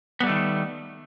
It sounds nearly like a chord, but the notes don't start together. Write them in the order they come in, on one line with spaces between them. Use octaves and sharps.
B3 G3 A3 D#3